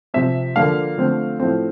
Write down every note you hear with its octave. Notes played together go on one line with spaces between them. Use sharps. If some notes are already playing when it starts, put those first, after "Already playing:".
C3 F3 C4 E5
D3 F3 A#3 D4 F5
D3 F3 A3 C4
A2 F3 C4